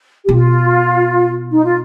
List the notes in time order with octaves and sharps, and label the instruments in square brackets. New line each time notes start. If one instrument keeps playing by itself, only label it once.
[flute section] G4
[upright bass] B2 [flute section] F4
[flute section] D#4
F4